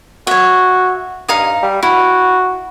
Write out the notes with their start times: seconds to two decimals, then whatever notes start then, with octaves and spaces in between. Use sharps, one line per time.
0.27 F#4 C#5 E5
1.28 G2 D#4 F5 D#6
1.62 G3
1.83 E4 F#4